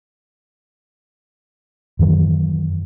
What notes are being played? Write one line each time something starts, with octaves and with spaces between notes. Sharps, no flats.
F#2 D#3 E3 F#3